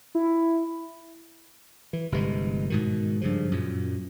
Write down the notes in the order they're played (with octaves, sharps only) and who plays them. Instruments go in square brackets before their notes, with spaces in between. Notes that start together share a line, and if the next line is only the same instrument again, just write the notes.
[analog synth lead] E4
[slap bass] E3
G1 C3 E3 G#3
G#2 B2 D#3
G2 C#3 F3
F#2 A#2